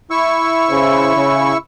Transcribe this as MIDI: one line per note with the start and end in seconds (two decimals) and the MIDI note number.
0.11 1.57 64
0.11 1.57 85
0.11 1.57 88
0.69 1.11 49
0.69 1.11 72
1.15 1.51 49